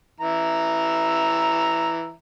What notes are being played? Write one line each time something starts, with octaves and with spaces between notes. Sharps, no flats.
E3 E5 A#5